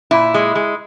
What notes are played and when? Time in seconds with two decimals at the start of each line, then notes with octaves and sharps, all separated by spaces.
0.11 A#2 E4
0.34 G#3
0.55 G#3